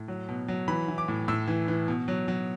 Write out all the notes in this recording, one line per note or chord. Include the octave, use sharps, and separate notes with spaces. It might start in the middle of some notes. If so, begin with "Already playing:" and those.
Already playing: A2
F#3
B2
F#3
E3 B5
E3
D6
A2
A2 E6
E3
E3
B2
F#3
F#3